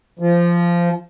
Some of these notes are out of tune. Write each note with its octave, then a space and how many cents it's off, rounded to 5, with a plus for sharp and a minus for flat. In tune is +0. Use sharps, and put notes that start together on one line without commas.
F3 -15